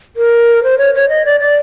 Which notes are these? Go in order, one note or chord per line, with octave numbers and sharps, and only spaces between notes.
A#4
C5
C#5
C#5
D#5
D5
D5